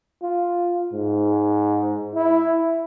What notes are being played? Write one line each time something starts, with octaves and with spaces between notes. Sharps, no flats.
F4
G#2
E4